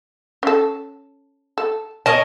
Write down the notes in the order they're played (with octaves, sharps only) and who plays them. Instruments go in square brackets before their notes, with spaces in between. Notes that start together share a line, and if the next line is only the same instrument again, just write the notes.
[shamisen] C#4 A4
A4
[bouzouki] C#4 A#4 D#5 [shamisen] A5